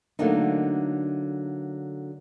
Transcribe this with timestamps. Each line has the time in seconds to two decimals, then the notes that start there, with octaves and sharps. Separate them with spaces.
0.19 D3 F#3 A3 A#3 D4 D#4